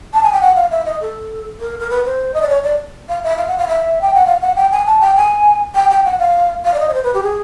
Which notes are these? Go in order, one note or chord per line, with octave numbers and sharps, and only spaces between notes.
A5
G#5
G5
F#5
F5
E5
D#5
A4
A#4
A#4
B4
C5
D#5
D5
C#5
D5
F5
E5
F5
F#5
F5
E5
G5
F#5
F5
F#5
G5
G#5
A5
G5
G#5
G5
G5
F#5
F5
F5
D5
D#5
C#5
C5
B4
G4
G#4